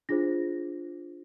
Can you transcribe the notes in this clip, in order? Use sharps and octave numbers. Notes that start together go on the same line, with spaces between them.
D4 F4 G#4 C5 A#6